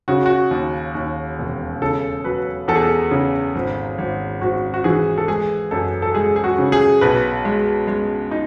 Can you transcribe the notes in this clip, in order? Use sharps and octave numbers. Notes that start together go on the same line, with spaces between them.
C#3 F#4
F#4
D#2
D#2
E1
C#3 A4
F#3 B4
E2 A4
G#4
A4
C#3
G#1
G#1
G#1 F#4
F#4
E3 G#4
A4
G#3 G#4
F#2 A4
A4
G#3 G#4
G#4
F#4
C#3
G#4
B1 B4
G#3
G#3
D#4